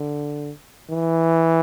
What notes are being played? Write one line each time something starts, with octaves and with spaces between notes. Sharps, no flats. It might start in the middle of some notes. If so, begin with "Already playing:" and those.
Already playing: D3
E3